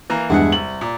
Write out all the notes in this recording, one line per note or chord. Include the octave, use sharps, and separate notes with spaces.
E3 A#3 A#5
E2 G2 G#3 E4 G#4 F#5
C2 F#7
A#2